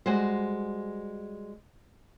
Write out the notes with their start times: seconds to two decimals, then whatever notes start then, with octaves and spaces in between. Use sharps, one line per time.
0.06 G3 G#3 F#4 C5